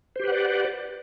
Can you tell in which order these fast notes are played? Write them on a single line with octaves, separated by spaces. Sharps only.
C5 G4 B4 F#5 D5